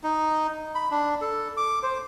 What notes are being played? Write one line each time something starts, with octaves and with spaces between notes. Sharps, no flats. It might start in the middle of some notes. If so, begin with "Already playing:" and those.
D#4
B5
D4
A4
D6
C5